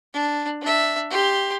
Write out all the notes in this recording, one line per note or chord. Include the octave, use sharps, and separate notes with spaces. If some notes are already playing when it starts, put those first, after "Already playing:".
D4
D4 E5
G4 C6